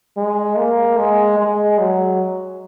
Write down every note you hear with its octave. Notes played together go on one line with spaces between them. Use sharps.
G#3
A#3
G#3
G#3
F#3